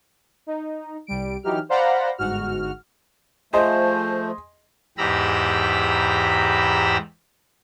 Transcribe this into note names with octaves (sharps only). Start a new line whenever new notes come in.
D#4
C2 G3 D7
E3 F#3 D#4 G4 F6
C5 D5 F5 F#5 A#5 B5
G1 G#2 F#4 F6
F3 A3 G#4 C5 D#5 C6
E2 G#2 G4 A#5 B5 E6